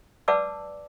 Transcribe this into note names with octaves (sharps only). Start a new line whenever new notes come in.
B4 D5 F#5 A5 D6 E6